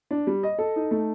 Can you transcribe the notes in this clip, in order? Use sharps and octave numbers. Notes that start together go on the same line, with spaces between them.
D4
G3
D#5
A4
D#4
A3